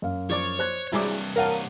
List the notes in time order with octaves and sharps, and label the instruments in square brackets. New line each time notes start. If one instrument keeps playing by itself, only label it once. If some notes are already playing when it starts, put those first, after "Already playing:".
[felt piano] F#2 F5
[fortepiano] F3 D5 D6 [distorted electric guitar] C#5
[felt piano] C5 F#6 G#6
[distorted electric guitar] G2 C3 [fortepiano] F#3 G3 D6 [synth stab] E4 G#4
[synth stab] A#4 F5 D#7 [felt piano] C#5 F#5 A5